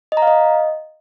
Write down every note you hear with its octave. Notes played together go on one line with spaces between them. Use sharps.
D#5
A#5
F5
D#5